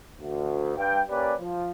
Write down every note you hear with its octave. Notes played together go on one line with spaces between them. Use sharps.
D2
G2 G5
A#3 C#4 G4 B4 D5
F3